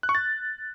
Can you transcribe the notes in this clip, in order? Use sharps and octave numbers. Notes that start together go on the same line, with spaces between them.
F#6
C#6
A6